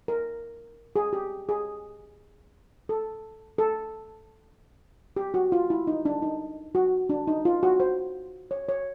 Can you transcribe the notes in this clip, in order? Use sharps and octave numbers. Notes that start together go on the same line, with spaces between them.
A#4
G#4
G4
G#4
A4
A4
G4
F#4
F4
E4
D#4
D4
D#4
F#4
D4
D#4
F4
F#4
C5
C#5
C#5